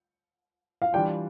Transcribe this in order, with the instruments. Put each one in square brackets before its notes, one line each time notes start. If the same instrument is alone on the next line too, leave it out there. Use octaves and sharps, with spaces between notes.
[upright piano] F5
[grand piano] E3 G3 D4 F4 [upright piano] G5